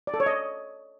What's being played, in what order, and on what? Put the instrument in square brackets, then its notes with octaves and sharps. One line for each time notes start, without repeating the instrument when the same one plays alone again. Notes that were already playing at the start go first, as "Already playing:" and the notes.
[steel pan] D5
A4
C#5
D#5